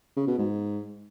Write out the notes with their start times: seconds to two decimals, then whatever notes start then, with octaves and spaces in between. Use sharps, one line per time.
0.16 C#3
0.27 B2
0.38 G#2